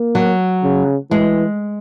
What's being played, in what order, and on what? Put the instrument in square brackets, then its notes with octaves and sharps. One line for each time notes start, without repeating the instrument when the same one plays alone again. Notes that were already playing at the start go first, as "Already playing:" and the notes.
Already playing: [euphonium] A#3
[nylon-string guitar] F#3
[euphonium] C#3
[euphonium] E3 [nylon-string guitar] G#3